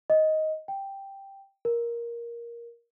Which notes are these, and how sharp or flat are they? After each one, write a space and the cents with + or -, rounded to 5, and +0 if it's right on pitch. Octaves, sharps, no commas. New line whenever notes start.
D#5 +10
G5 +0
A#4 +10